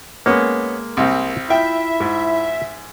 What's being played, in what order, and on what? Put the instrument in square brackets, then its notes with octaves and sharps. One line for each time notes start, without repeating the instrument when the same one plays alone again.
[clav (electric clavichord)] G#3 A#3 [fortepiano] B3 C#4
[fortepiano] C2 C4
[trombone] E4 [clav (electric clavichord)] F4 [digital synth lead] E5 [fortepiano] G5
[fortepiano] G#2